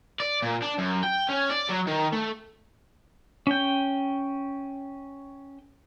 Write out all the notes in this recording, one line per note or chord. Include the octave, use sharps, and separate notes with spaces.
D5
A#2
D4
F#2
G5
C#4
D5
F#3
D#3
A3
C#4 G5